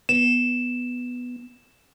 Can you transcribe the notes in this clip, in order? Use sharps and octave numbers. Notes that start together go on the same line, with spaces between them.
B3 E7